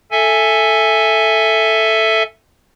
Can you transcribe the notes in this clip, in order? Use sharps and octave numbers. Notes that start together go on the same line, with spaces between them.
A4 E5 G#5